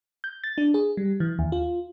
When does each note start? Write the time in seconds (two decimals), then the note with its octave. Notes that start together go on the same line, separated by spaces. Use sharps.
0.24 G6
0.44 A6
0.58 D4
0.74 G#4
0.97 G3
1.20 E3
1.39 D#2
1.52 F4